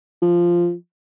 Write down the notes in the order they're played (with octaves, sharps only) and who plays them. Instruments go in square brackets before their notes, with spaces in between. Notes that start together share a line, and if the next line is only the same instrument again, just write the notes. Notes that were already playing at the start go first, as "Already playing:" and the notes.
[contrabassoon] F3